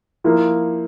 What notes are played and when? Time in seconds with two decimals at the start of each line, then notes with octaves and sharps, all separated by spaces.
0.24 F3 A#3 E4